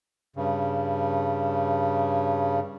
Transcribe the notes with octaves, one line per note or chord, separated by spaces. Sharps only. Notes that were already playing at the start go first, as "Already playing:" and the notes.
G2 C#3